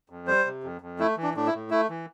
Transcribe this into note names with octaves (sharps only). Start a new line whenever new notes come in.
F2
G3 C5
C3
F2
F2
A3 E4
E3
D4
A2 D4
E4
A2
A3 E4
E3